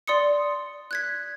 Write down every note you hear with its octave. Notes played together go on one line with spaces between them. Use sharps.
D5 C6 D#6 C#7
F#6 G#6 B6